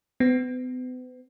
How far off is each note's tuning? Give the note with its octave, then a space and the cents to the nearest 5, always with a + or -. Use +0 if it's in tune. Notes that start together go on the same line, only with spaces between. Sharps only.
B3 +40